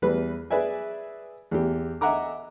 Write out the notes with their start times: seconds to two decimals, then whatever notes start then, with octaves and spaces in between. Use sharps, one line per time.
0.02 E2 G3 B4
0.51 G#4 B4 D5 E5 G#5
1.51 E2 G4
2.01 D#5 E5 F#5 G#5 A#5 D6